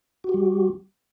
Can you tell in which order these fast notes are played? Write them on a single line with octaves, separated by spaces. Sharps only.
F#4 G4 G3